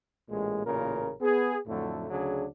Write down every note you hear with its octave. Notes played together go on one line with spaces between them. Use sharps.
A1 A#2 G#3
A1 A#2 C#3 A#4
B3 G#4
F2 A2 D3 F#3 A3
D2 C#3 F#3 D4 G#4